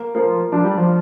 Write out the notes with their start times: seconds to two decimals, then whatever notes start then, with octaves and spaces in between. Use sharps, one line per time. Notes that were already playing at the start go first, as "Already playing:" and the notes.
Already playing: A#3
0.15 F3 A#3
0.52 F3 D4
0.64 G3
0.78 F3